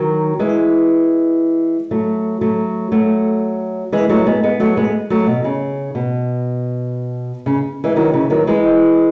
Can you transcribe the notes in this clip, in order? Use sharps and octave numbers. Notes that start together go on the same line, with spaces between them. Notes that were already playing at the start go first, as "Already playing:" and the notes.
Already playing: D#3 F#3
E3 G#3
F#3 A3
F#3 A3
F#3 A3
E3 G#3
F#3 A3
G#3 B3
G#3 B3
F#3 A3
G#3 B3
F#3 A3
B2
C#3
B2
C#3
E3 G#3
D#3 F#3
C#3 E3
D#3 F#3
E3 G#3